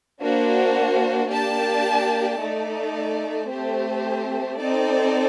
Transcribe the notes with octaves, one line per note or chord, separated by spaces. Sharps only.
A#3 D4 F#4 C5
A#3 D4 G4 D5 A5
A3 D#4 A4 D5
A3 C4 G4 C5
C4 D#4 A4 D5